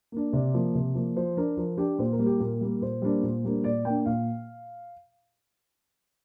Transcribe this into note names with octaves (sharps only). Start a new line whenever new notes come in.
A#3 D4
C3 D5
F3 A#3
C3
F3 A#3
F3 C5
D4 A#4
F3 A#4
D4 G4
A#2 C5
A#4
G3 A#3
G4
A#2 A#4
G3 A#3
A#2 C5
G3 A#3 D4
A#2
G3 A#3 D4
A#2 D5
A#3 G5
D4
A#2 F5